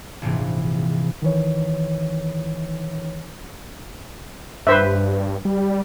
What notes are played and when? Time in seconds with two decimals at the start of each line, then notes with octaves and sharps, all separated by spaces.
0.22 A#1 G#2 C3 E3
1.22 D#3 E3 C#5
4.67 G2 B4 C5 E5
5.45 G3